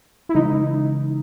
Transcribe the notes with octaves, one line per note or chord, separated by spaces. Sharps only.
E4
C#3 E3 G#3 C#4 D#4